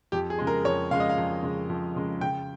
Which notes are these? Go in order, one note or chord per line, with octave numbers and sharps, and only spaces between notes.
F2 G4
G#4
C#3 G#3
A#4
F2 C#5
C#3 G#3 F5
D#5
F5
F2
C#3 G#3
F2
C#3 G#3
C#3 G5